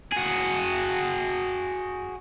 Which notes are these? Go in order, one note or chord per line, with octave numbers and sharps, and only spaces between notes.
F#4 G#4